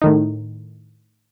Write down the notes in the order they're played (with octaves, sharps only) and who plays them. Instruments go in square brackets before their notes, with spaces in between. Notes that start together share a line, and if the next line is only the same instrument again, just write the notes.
[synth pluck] A2 D#3 D#4